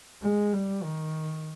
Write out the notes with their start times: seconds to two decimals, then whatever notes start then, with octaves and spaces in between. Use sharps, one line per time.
0.22 G#3
0.53 G3
0.83 D#3